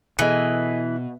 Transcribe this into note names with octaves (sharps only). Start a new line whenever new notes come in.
B2 E3 B3 G#4 A4 D#5